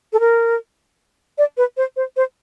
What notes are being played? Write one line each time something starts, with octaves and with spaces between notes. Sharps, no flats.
A4
A#4
D5
B4
C5
C5
C5